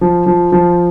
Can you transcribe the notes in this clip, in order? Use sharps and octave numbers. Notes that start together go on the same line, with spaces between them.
F3
F3
F3